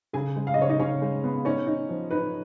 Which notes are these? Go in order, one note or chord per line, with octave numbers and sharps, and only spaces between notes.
C#3 G#4 G#5
G#3
F5
D#5
C#3 C#5
D#4 D#5
C#3 C#4 C#5
G#3
B3
C#4 D#4 C#5
D#4
F3
D#4 B4